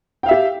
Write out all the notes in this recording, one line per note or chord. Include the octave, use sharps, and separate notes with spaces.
G4 E5 F5 G5